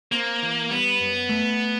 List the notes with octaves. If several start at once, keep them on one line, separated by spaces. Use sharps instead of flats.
A#3 C4
E3
G3 B3
F#2
A3